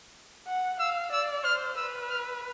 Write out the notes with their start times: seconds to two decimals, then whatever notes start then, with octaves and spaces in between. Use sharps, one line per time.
0.47 F#5
0.80 F5 E6
1.12 D5 E6
1.44 C5 F6
1.77 B4 E6
2.09 F6